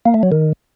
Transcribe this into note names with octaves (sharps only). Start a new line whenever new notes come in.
A#3
A3
F#3
D#3